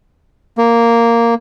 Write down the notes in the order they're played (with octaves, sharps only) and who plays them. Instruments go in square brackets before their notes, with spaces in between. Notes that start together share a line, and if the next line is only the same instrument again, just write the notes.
[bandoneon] A#3